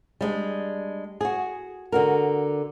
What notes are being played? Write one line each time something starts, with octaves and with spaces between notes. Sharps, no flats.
G3 G#3 D4
F#4 G#4
D3 F#4 A#4